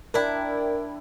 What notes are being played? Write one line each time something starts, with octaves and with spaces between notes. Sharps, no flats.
D4 E4 A#4 D5 G5